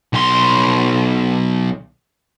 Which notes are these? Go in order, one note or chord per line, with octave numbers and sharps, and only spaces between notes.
B1 C6